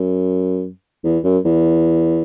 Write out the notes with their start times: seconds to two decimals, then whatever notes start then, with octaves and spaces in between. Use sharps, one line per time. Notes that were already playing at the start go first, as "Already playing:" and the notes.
Already playing: F#2
1.04 E2
1.24 F#2
1.45 E2